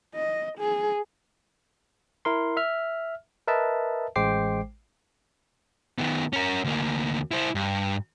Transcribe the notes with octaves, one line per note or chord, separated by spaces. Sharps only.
D#5
G#4
E4 A#4 C6
E5 F6
A#4 B4 D#5 E5 A5
A1 G#3 C5 G5 D6 C7
D#3 B3
C#4 A#4
D2 A#3
E4 C5
G2